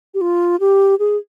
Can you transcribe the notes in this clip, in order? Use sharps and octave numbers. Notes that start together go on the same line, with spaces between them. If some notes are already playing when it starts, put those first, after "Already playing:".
G4
F4
G4
G#4